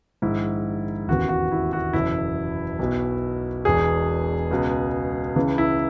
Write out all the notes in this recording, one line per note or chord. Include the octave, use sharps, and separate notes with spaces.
A#1 G#2 D#3 E4
E1 D#2 C#3 E3 F#4
F#4
E4
F#4
F#1 E2 B2 E4
B1 B2
E1 E2 B2 G#4
C#2 B2
C#2 C#3 E3
E4